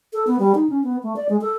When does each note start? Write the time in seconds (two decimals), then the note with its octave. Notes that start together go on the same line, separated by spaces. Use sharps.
0.13 A4
0.27 B3
0.39 G3
0.55 D#4
0.69 C#4
0.84 B3
1.03 A3
1.16 D5
1.29 G#3
1.42 A4